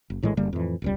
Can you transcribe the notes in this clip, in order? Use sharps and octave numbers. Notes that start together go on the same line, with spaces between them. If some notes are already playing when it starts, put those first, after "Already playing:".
F#1
A#1 A2 E3 G#3
F#1 D3 G3 A#3
F2 A2 E3
E1 C#2 G3